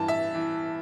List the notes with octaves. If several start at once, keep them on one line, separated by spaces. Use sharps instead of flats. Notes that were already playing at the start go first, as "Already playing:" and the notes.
Already playing: G2 E3 A5
E5
E3